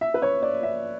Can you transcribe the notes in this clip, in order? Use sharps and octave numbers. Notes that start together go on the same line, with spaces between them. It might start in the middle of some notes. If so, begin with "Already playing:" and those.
E5
B4
C#5
D5
E5